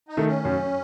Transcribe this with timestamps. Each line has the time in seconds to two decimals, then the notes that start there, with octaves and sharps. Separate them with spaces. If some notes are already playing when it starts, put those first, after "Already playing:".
0.08 D#4
0.17 D#3 A3
0.27 C#4
0.45 F#2